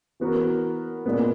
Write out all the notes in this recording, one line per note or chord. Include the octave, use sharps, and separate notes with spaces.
E3 B3 F#4 A#4
A#2 G#3 B3